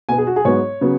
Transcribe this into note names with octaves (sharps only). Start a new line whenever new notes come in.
B2 B3 G#5
G#4
F#4
G#4
G#2 F#3 B3 C#5
C#3 F#3 B3